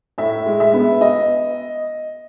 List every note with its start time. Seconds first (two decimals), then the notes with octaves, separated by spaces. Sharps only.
0.18 A2 E5
0.46 G#3
0.60 E5
0.74 B3
1.01 D#5